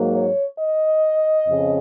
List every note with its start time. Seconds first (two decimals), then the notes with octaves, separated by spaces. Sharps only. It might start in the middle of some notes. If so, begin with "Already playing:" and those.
Already playing: G#2 F#3 A#3
0.12 C#5
0.57 D#5
1.46 F2 C#3